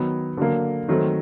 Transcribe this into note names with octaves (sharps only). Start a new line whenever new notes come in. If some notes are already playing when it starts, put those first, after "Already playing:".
Already playing: D#3 F#3 B3
D3 F#3 A#3
D#3 F#3 A3 C4